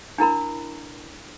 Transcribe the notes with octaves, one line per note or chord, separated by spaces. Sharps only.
D4 E4 A#4 B5